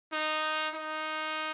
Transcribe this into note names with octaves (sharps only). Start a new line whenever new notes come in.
D#4
D#4